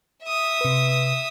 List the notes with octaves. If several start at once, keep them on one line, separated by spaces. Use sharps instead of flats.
E5 D#6
C3 B4